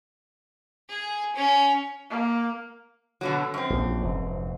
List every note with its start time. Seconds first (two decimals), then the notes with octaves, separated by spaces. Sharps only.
0.89 G#4
1.36 C#4
2.10 A#3
3.21 B2 D3 F#3
3.54 F#2 C4
3.70 A#1
4.01 F1 G#2